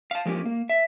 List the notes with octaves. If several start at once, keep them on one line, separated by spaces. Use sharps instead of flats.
F5 A5
F3 G#3 A#3 C#4 G4
A#3
E5